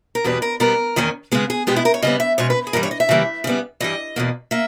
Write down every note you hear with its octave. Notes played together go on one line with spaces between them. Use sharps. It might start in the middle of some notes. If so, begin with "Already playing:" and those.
A#4
E2 B2 G3 B3 B4
A#4
B2 G3 B3 A#4
E2 D#3 A#3 C#4
C#3 G#3 B3 G#4
G#4
B2 G#3 B3 G4
E4
A#4
C#5
C#3 G3 B3 D#5
E5
B2 G#3 C#4 C#5
B4
G#4
G2 E3 G3 A#4
C#5
D#5
E5
C#3 E3 G3 A#3
C#3 G3 B3
G2 E3 G3 D#5
E2 B2 A#3
A#3 E5